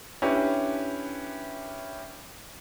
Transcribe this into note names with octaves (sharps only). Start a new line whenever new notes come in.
C#4 D4 E4 G4 B4